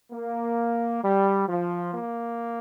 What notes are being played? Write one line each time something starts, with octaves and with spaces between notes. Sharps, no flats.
A#3
G3
F3
A#3